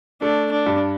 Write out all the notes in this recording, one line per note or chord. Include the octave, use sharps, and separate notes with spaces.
A3 D4
D4
G2